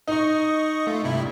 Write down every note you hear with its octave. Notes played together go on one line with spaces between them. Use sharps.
D#4 D#5 C#6
A3 F4
G2 C3 E4